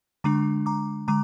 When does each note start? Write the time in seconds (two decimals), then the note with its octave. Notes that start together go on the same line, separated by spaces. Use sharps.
0.24 D3 G#3 D4 A#5 D6
0.66 A#5 D6
1.08 D3 G#3 A#5 D6